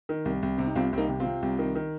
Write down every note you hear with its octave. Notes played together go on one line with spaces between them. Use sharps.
D#3
C2
C2
C3 C4
D#4
C2 C4 F4
C2 A#3 C4 D#4
C3
C4 F4
C3
C2
D#3
D#3